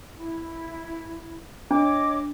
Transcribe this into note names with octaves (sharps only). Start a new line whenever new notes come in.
E4
D4 C#5 D#5 D6